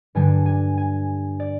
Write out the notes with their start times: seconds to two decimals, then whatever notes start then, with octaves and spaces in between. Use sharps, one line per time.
0.15 G2 D3 G3 D4 G#5
0.46 G#5
0.77 G#5
1.40 D5